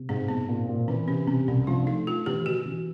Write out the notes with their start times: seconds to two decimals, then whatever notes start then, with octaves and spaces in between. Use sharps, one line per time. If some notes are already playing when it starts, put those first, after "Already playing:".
Already playing: C3
0.09 G#2 C4
0.28 G#2 B3
0.49 A#2
0.69 A#2
0.88 E3 C4
1.07 C3 C#4
1.27 C3 C4
1.48 C2 C#4
1.67 F3 D4
1.87 A3 D#4
2.07 A3 F4
2.26 E3 G4
2.46 E3 F#4
2.65 E3